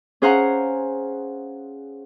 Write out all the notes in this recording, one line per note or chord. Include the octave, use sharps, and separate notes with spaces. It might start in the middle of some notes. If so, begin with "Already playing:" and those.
C#4 G#4 C5 F5 F#5 A#5